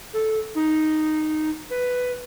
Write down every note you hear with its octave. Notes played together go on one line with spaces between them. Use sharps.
A4
D#4
B4